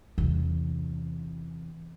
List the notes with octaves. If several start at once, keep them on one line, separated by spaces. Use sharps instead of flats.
E2 C3